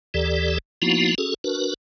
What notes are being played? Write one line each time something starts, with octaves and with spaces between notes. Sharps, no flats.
D#2 E3 G4 A4 D5
F3 A#3 B3 D#4 E4 F#4
C#4 F#4 G#4 A4
D4 F#4 A#4 B4